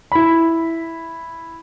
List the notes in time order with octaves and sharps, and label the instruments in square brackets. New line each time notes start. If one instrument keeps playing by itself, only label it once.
[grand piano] E4 B5